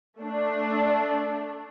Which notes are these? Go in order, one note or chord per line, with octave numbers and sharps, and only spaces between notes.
A3 D4